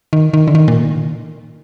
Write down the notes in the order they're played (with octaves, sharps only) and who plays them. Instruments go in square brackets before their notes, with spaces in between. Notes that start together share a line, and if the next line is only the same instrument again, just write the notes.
[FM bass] D#3
D#3
D3
D#3
A#2